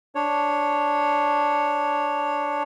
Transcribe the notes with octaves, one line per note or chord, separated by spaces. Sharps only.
D4 C#5